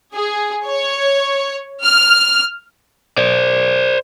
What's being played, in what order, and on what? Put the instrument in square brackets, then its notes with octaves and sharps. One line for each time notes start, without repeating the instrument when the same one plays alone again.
[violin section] G#4
C#5
F6
[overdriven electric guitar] C5 D5